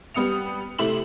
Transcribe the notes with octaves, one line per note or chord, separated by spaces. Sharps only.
G3 B3 D#6 C#7 F7
C3 A3 E4 C6 E7 F#7